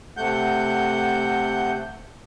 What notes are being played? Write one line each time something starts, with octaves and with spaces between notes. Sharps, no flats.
C3 A3 F#5 G6